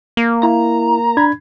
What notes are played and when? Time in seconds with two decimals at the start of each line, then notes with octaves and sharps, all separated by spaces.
0.17 A#3
0.43 E4 A#5
1.17 D4 B5 G#6